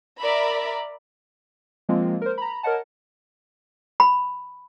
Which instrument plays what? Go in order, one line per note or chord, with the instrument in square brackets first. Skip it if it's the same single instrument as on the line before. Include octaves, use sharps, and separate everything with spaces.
[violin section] A#4 D5 E5 A#5 B5
[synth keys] F3 G#3 A#3 C4 F4
A#4 C5
A#5 B5
A#4 C#5 D#5 F#5 A5
[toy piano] B5